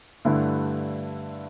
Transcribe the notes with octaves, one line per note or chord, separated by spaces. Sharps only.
G2 D3 A3 E4